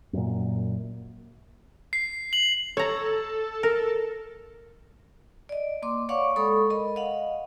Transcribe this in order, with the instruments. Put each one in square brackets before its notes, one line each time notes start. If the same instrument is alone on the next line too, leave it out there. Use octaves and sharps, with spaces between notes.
[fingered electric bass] F#2 A#2
[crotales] C7
F#7
[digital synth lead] A4 [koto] C#5 A#5
[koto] A#4
[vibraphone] D5 D#5
A#3 C6 D6
C#5 D5 F5 F#5 C#6 D6
G#3 A4 B5 C#6 D#6
A#4 D#5 B5
D#5 F5 F#5